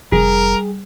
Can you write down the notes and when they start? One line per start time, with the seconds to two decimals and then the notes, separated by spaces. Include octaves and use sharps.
0.12 F1 G3 G#4 A#4